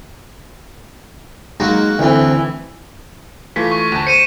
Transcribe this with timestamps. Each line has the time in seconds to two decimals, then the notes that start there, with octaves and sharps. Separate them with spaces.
1.60 F#3 G#3 A#3 D#4 F#4
1.99 D2 D3 E3 C4
3.56 E3 A3 F4 B6
3.71 C#6
3.92 D2 A5
4.07 C5 C#7 D#7 E7